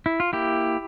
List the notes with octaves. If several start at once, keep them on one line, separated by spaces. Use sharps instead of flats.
E4
F4
A#3 E4 G4